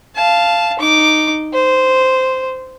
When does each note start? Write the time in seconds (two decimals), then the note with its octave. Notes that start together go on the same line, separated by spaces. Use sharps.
0.16 F5 A5
0.79 D#4 D6
1.54 C5